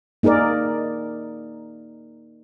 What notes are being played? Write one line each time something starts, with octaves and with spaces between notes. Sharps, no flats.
A#3 D#4 G#4 A#4 D5